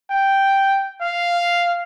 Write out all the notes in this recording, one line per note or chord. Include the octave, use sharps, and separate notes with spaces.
G5
F5